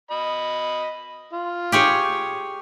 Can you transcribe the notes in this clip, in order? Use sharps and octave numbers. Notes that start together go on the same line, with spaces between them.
D#5 B5
F4
G4 G#4 C#5